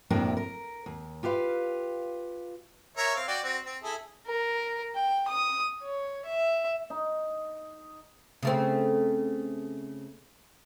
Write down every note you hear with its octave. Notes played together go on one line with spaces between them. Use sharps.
F2 A2 C3 A#3 D4 A#4
A#4
D#2
F4 G4 B4 F5
A#4 C#5 E5
C4 F5
F#4 D5 G5
C4 F#4
C4
E4 G#4 A4
A#4
G5
D#6
C#5
E5
D#4
C#3 A3 C4